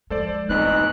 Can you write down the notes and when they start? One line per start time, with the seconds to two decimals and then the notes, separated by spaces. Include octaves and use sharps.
0.10 F3 G#3 A4 C5 D5
0.49 A1 F2 B3 D#4 B4 F#6